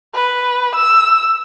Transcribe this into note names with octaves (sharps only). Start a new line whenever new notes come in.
B4
E6